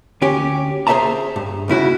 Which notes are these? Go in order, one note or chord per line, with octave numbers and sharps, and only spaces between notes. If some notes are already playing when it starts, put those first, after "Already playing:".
D2 C#4 G4
G#4 C5 D5 E5 A5 A#5
G2
B1 C#3 E4 F#4